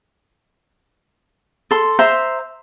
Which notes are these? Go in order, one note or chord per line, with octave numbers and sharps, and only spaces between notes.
A4 C6
C5 E5 A#5 C6